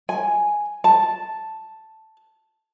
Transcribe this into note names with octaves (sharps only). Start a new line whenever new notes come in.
G#5
A5